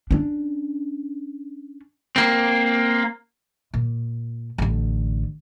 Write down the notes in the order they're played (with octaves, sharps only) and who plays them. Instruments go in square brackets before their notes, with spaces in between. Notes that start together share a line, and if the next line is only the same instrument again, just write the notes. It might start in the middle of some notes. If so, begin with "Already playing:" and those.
[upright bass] C#4 D4
[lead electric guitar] A#3 C4
[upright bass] A#2
A1 D3